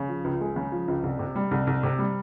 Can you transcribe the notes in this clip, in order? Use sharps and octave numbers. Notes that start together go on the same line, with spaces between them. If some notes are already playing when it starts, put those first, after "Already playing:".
Already playing: C#3
F3
C#2
G#3
C#3
F3
C#2
C2
C3
G3
C2
C2
C3
G3